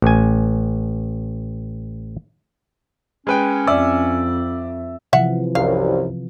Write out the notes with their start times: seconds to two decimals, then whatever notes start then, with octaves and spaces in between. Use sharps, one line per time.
0.02 A1 G#5
3.27 G#3 C#4 B4 G5
3.67 F2 D5 E5
5.13 C3 E3 F3 E5 F#5
5.55 C2 F#2 F5